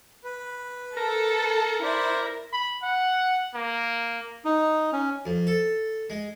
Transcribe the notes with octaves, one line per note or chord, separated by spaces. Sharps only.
B4
A4 A#4
E4 C5 D5
B5
F#5
A#3
D#4
C#4
F2
A4
G#3